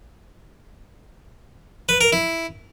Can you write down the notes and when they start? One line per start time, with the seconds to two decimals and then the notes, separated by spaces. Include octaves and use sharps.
1.89 B4
2.01 A#4
2.13 E4